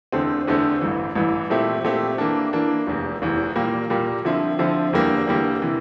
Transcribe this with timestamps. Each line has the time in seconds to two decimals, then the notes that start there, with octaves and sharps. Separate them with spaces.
0.12 E2 D3 A3 C4
0.47 E2 D3 A3 C4
0.81 A1 G2 E3
1.15 A1 G2 E3
1.50 A#2 A3 C4 E4 G4
1.84 A#2 A3 C4 E4 G4
2.18 E3 A#3 D4
2.53 E3 A#3 D4
2.87 F1 E2 E3
3.22 F1 E2 E3
3.56 A#2 G3 A#3
3.90 A#2 G3 A#3
4.25 D3 F3 C4 E4
4.59 D3 F3 C4 E4
4.93 E2 D3 G3 A#3
5.27 E2 D3 G3 A#3
5.62 C3 E3